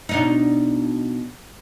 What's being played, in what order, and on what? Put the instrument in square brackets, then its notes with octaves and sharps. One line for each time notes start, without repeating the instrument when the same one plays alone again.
[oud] B2 D4 D#4